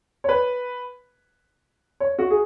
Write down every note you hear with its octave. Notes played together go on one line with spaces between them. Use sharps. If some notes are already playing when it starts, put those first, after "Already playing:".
C#5
B4
C#5
F#4
G#4